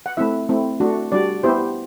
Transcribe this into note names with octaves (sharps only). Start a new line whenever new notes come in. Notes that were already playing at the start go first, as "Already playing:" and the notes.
F#5
A3 C4 E4 E5
A3 C4 E4
A3 D4 F#4
G3 D4 F#4 D5
B3 E4 G4 C5